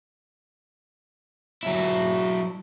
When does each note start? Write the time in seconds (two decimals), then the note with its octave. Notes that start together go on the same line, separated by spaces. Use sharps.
1.63 F#3 E4